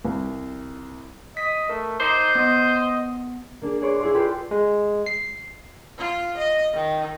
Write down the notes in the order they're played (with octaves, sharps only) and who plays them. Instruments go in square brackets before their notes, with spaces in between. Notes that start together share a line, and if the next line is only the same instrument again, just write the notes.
[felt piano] C2
[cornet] D#5 [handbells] B6
[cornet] A3 [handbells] A#4
[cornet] D#4 [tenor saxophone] C5 [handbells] D6 C7
[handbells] B3 [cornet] D#5
[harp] A#3 D4 G#4
G#4 B4 C#5 D5 C6 C#6
E4 G#4 D5 F5 C6
F4 G4 A4 B4 B5 C6
[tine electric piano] G#3
C7
[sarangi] F4
D#5
D#3